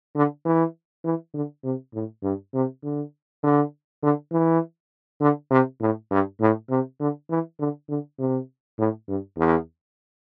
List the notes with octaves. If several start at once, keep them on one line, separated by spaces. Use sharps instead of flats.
D3
E3
E3
D3
C3
A2
G2
C3
D3
D3
D3
E3
D3
C3
A2
G2
A2
C3
D3
E3
D3
D3
C3
A2
G2
E2